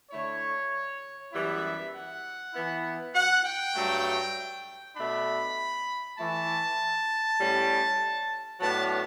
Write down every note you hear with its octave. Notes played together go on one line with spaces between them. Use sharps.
D3 A3 E4 C#5
F#2 E3 G3 B3 E4 E5
F#5
E3 B3 E4
F#5
G5
G2 F#3 A3
B2 A3 D4 B5
E3 A3 E4 A5
A2 G3 C#4
A2 F#3 B3 D4 A5